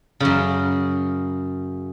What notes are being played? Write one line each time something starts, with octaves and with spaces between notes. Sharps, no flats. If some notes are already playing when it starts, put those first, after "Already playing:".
F#2 C#3